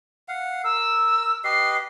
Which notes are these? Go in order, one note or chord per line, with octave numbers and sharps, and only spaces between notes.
F5 F#5
A#4 E6
G4 B4 D#5 C7